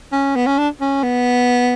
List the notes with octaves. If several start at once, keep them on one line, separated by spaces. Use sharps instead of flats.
C#4
B3
C#4
D4
C#4
B3